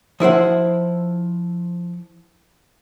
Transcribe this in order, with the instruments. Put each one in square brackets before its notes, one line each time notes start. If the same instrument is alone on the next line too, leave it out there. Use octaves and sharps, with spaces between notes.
[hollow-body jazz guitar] F3 E4 C5 F#5